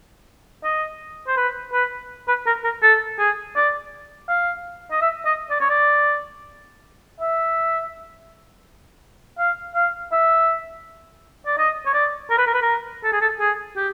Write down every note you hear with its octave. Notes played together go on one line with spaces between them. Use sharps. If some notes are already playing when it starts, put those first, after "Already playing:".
D#5
C5
B4
B4
B4
A#4
A#4
A4
G#4
D5
F5
D#5
E5
D#5
D5
C#5
D5
E5
F5
F5
E5
D5
D#5
C#5
D5
A#4
B4
A#4
B4
A#4
A4
G#4
A4
G#4
G4